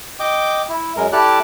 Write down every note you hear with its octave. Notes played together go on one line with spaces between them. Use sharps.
D#5 G5 D6
E4
F#2 G#3 A#4
E4 G4 A4 D5 F#6